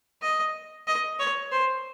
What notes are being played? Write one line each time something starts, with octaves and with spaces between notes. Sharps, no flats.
D#5
D#5
C#5
C5